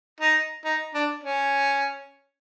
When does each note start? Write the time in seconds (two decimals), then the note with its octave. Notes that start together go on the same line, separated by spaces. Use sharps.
0.21 D#4
0.65 D#4
0.94 D4
1.24 C#4